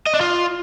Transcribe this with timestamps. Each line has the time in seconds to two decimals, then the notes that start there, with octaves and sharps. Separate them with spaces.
0.06 D#5
0.14 D4
0.21 F4